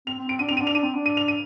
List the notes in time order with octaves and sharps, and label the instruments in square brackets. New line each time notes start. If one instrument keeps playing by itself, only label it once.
[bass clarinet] C4 [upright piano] F7
[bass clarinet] C4
[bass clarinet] C4 [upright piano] D7
[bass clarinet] D4 [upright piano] D#7
[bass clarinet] C4 [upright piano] F7
[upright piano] D#7
[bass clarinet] D4
[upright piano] F7
[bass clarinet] D4 [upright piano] D#7
[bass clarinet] C4
D4
[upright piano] D#7
F7
D#7